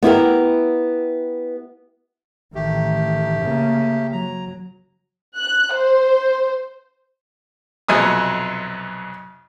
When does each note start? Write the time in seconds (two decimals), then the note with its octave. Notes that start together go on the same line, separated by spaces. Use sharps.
0.03 B3 E4 G4 A#4
2.55 A1 D#3 A3 G4
3.40 C#3 A#3
4.13 F#3 A#5
5.37 F#6
5.74 C5
7.88 B1 F2 C3 F#3 G#4 D#6